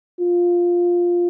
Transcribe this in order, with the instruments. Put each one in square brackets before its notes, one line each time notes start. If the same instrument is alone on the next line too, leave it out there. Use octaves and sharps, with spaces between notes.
[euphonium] F4